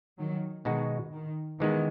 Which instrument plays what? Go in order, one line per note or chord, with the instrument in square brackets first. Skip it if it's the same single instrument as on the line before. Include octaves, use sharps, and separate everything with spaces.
[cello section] D#3 F#3
[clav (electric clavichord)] B2 G#3 D#4 F#4 [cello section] D#3
[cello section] D#3
[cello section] D#3 [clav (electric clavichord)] E3 G#3 B3